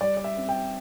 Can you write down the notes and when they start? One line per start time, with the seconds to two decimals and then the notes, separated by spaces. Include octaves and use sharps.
0.01 G3 D5
0.17 D5
0.24 E5
0.37 C4
0.49 G5